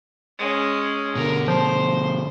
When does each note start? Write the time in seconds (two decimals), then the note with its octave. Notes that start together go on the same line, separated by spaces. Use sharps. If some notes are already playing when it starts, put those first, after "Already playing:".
0.39 G#3 C#4
1.15 B2 D3 A#4
1.48 F3 C5